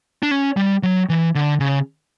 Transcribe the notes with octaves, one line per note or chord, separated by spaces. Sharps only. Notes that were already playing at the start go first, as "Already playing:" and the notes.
D4
C#4
G3
F#3
E3
D3
C#3